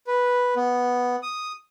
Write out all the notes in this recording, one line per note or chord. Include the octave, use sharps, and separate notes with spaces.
B4
B3
D#6